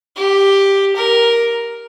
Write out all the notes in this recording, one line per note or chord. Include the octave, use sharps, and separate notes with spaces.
G4
A#4